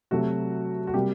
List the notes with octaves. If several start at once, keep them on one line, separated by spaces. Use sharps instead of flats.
C3 F#3 A3 F#4
F#4
C3 G3 A#3 G4